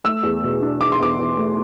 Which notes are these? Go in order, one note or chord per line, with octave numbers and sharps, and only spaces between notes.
A3 E6
E2
B2
D4
D4 D6
C6
E2 D6
E2
A3